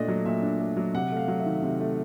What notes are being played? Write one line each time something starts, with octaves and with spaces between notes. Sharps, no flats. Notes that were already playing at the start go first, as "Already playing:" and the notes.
Already playing: A#2 A3 D4 D5 D#5
F#3
A#2 E5
D4
A3
F#3
C3 F#5
A3 F5
F#3
E5
D#3
C3
A3